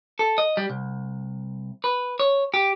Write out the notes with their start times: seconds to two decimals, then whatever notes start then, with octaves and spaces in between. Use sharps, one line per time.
0.19 A4
0.38 D#5
0.57 G3
0.70 C2
1.84 B4
2.19 C#5
2.54 G4